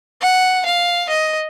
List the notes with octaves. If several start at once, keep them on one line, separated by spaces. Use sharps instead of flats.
F#5
F5
D#5